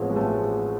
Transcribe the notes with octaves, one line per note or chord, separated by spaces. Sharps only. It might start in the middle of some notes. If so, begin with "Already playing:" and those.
Already playing: A1 A2 F3 G#3 B3 C4
G#3
A1 A3